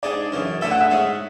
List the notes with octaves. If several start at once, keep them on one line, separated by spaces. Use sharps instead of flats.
G#2 G#3 D4 G#4 D5
F#2 C#3 E3
D3 A3 E4 A4 E5
F#5
E5
G#2 G#3 C#4